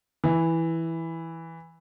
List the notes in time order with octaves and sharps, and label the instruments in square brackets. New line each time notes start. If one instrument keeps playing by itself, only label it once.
[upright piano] E3